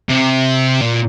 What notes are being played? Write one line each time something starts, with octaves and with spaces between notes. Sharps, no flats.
C3
A#2